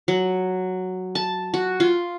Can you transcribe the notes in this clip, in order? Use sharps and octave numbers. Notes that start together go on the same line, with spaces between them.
F#3
A5
F#4
F4